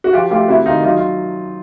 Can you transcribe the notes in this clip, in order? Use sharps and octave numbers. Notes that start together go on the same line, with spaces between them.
F#4
F3 F4 G4
A3 F4 G4
C3 E4 F#4
D#3 D#4 F4
F#3 D#4 F4
F4